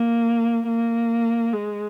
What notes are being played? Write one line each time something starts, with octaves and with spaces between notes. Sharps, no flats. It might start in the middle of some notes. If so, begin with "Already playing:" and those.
Already playing: A#3
A#3
G#3